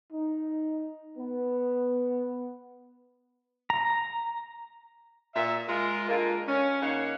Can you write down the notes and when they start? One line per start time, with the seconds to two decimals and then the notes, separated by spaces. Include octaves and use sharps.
0.13 D#4
1.18 B3
3.70 A#5
5.35 A#2 E5
5.68 G#3 F4 A#4
6.09 D3 G#3 A#3 F4 A#4
6.47 C#4
6.82 C#3 A#3 D#4 C#5 F5 F#5